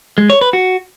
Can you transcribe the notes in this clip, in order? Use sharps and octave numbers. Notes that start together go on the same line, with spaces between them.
G#3
C#5
B4
F#4